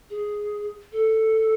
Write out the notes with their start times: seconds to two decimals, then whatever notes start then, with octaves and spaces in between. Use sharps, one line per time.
0.10 G#4
0.92 A4